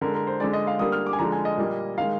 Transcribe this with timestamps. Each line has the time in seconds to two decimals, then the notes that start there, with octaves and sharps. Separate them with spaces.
0.01 D3 G#3 A#4
0.15 A#4
0.27 C5
0.40 D3 G#3 D5
0.53 D#5
0.67 F5
0.79 D3 G3 A#3 D#6
0.92 F6
1.06 D6
1.13 G#5
1.19 D3 F3 G#3 A#5
1.32 G#5
1.45 D#5
1.57 A#2 G3 A#3
1.98 D#3 G#3 F5